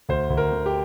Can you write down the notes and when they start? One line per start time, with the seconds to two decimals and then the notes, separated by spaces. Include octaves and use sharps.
0.09 D2 C5
0.30 D2
0.37 A#4
0.52 D3
0.66 G4